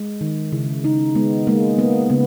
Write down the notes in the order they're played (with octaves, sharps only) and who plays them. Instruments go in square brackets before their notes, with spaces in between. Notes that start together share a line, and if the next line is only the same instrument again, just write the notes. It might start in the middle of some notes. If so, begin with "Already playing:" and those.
Already playing: [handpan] G#3
D#3
C#3 E4
C#3 D#4
G#3 B3
G#3 A#3
A#3 B3
C#3 B3